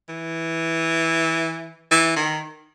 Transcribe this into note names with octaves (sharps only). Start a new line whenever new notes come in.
E3
E3
D#3